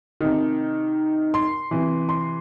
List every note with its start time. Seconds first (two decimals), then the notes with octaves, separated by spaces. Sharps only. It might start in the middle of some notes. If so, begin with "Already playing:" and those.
0.21 C3 D#3
1.34 C6
1.71 C3 E3
2.09 C6